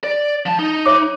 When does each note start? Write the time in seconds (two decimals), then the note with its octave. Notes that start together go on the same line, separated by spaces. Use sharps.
0.04 D5
0.46 F3 A5
0.59 D#4
0.86 C#5 E5 D6